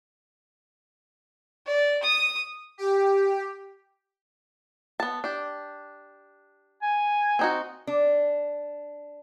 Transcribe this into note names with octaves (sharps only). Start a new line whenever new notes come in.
D5
D#6
G4
B3 A5
D4 G4
G#5
C4 D#4 F#4
D4